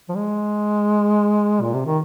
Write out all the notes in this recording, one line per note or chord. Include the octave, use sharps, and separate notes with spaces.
F3
G#3
A#2
C3
D#3